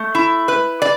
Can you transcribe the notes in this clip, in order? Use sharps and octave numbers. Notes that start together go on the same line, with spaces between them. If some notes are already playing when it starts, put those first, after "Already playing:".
Already playing: A3
E4
B4
D5